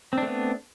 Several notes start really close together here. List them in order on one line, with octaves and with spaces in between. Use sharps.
C4 D4 A3 B3